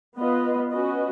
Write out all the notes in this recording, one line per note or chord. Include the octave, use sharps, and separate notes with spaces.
B3 F4 B4 D#5
C#4 F#4 B4 D#5